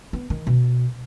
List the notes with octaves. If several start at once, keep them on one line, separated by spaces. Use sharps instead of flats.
B3
D#3
B2